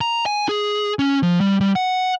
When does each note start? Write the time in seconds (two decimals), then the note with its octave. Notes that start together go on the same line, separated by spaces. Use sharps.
0.01 A#5
0.26 G#5
0.49 G#4
0.99 C#4
1.23 F3
1.41 G3
1.61 G3
1.76 F#5